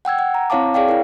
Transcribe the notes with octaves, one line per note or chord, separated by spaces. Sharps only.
F#5 G5 E6 G#6
F#5
A#5
C4 E4 C#5 F5 A5 D6
G#4 C#5 D5 F5 G5
E4 A#4